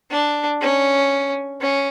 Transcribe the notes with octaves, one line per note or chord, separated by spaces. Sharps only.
D4
C#4
C#4